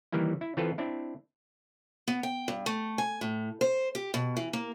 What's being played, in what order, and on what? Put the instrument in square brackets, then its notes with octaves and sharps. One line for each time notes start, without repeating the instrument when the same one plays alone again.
[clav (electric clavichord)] D#3 E3 G3 A#3 E4
E4
E3 C4 F4 A4 B4
C4 D4 E4
[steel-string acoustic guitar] B3
G5
G2
A3
G#5
A2
C5
G4
B2
E3
A#3